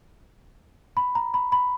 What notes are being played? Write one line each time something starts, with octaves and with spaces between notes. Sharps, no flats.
B5
A#5
B5
B5